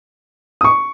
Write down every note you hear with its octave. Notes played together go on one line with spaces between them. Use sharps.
D#6
C#6